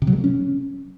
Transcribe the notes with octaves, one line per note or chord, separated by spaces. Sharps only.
C3
F#3
G#3
A#3
C#4